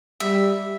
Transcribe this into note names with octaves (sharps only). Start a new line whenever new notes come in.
G3 E5